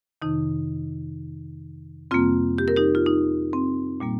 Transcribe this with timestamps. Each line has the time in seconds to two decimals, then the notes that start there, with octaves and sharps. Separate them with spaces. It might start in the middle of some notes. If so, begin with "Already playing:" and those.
0.22 F2 C3 D#3 D#4
2.11 F2 C3 G3 A#3 C4 F4
2.58 G4
2.68 A#4
2.77 D#4 G4
2.95 F4
3.06 D#4
3.53 C4
4.00 A#2 G3 A#3